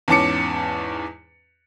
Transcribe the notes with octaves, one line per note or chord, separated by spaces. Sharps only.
E2 G#2 C#4 A5 D6 C#7